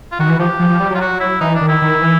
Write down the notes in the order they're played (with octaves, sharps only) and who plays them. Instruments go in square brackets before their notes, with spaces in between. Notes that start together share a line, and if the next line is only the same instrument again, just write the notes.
[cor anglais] F4
[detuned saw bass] D#3 [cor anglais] F#4
[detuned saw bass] E3
[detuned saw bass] F3 [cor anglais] G4
[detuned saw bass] F3
F3
G3
[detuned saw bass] F#3 [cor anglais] F4
[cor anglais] F#4
E4
[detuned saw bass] E3 [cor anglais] D#4
[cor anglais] D4
[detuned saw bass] D#3
[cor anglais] E4
[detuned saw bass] D#3
E3